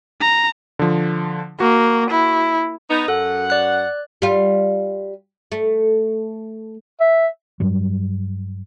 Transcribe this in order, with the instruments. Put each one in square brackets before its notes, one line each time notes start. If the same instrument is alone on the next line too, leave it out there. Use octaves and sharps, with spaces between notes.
[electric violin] A#5
[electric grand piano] D3 F3
[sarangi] A#3 [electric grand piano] F#4
[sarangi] E4
[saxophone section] B3 D#4
[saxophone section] F#2 F#5 [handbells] A4
[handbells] D5 F#6
[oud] G3 F4
A3
[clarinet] E5
[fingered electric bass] G2 F#3 G3